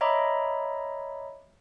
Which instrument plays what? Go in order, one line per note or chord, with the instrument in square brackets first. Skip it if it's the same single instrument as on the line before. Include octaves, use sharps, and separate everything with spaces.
[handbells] C#5 D#5 E5 A#5 B5 D6